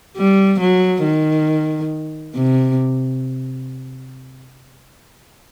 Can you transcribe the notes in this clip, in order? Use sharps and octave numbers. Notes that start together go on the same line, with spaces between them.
G3
F#3
D#3
C3